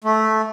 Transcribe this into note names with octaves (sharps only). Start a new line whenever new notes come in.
A3